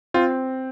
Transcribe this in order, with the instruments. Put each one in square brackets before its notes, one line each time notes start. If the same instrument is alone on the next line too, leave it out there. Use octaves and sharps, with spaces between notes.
[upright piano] C4 [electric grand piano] F4